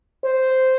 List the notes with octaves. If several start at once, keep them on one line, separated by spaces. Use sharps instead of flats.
C5